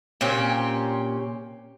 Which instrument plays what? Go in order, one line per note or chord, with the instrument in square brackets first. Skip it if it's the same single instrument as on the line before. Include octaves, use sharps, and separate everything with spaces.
[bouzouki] A#2 C4 C#4 G4